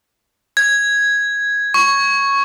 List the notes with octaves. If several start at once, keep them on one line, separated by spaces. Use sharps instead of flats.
G#6
C#6